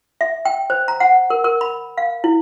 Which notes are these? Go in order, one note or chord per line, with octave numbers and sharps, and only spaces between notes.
E5
G5
C5
A#5
F#5
A#4
A#4
B5
F5
E4